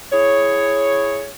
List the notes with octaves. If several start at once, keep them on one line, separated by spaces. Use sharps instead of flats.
E4 G#4 C#5